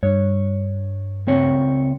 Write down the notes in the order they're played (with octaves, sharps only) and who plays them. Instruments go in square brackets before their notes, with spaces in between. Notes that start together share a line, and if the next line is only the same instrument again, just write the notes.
[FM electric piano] G2 [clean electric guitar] C#5
[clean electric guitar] C#2 C4 C#5